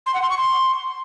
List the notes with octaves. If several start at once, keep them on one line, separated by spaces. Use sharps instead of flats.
C6
F#5
C6
C#6
C6